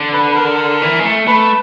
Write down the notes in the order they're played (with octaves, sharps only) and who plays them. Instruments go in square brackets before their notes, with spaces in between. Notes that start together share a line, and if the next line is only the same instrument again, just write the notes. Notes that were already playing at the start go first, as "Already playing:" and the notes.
Already playing: [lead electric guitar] D3
[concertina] B4
B4
A#4
[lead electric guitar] E3
G#3
A3
[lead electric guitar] A3 [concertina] B4